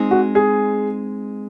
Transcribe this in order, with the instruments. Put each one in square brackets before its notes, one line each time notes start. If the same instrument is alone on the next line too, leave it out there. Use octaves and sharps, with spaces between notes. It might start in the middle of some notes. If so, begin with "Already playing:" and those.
Already playing: [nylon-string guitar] G#3 C4 D#4
[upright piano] F#4
G#4